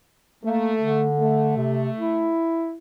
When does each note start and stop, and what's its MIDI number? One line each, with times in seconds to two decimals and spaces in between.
0.44 1.06 57
0.44 0.73 58
0.81 1.56 50
1.20 2.37 57
1.56 1.89 48
1.98 2.76 64